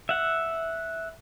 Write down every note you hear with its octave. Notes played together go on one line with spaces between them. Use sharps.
E5 F#5